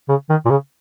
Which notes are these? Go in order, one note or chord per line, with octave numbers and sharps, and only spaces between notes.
C#3
D#3
A#2
C#3